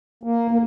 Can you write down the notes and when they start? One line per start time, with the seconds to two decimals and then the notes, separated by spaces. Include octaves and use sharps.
0.23 A#3
0.51 A#3